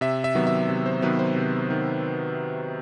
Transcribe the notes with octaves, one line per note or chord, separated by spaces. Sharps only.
C3 E5
E5
D#3 F#3 B3
E5
C3
C5
D#3 F#3 B3 B4
C5
C3
D#3